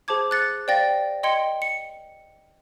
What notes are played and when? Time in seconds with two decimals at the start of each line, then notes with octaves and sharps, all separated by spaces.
0.08 G#4 C5 A5 D6 G#6
0.31 F#6 A6 C#7
0.67 C5 D5 F5 G5 A6 A#6
1.23 D#5 G5 C6 G#6 C#7 G7
1.62 C#7